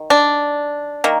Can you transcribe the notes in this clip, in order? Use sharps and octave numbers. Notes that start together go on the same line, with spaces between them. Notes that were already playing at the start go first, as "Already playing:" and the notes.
Already playing: D#3
D4
D#3 A#3